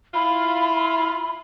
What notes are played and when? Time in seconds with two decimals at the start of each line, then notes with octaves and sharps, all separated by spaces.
0.14 E4 F4 B5